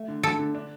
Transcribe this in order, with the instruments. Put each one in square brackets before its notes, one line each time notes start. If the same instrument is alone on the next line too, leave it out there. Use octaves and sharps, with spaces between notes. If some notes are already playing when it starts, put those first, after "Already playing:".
Already playing: [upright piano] A3
D3
[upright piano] D3 [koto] A4
[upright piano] D3
D4